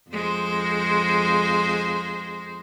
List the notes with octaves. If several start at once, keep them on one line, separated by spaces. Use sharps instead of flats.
F2 G#3 C5